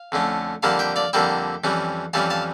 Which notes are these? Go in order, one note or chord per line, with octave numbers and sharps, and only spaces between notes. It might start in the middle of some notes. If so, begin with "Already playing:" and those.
Already playing: F5
F2 D3 A3 C#4
F2 D3 G3 A#3 E4 F5 A5
E5 G5
D5 F5
F2 D3 G3 A#3 E4 E5 G5
F2 E3 G3 C#4
F2 E3 G3 C#4 F5 A5
F5 A5